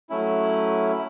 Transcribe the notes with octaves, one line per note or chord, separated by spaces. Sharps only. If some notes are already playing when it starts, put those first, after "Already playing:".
F#3 A3 C#4 E4